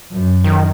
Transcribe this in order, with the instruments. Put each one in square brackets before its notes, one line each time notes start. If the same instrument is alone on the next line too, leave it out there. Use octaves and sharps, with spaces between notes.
[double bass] F#2
[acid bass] D#3